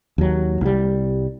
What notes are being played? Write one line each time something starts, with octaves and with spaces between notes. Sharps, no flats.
D#2 F#3
C2 G3